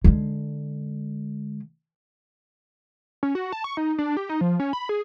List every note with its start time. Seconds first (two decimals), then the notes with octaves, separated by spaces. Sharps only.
0.04 D3 G#3
3.23 C#4
3.35 F#4
3.53 A5
3.64 C#6
3.77 D#4
3.98 D4
4.17 G4
4.29 D#4
4.41 F3
4.60 C#4
4.73 B5
4.89 G#4